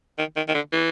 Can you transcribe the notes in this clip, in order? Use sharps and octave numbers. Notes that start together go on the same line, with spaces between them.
D#3
D#3
D#3
D3
E3